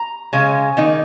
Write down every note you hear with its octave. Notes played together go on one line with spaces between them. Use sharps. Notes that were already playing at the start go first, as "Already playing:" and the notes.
Already playing: A#5
C#3 G#3 C#4
D#3 A#3 D#4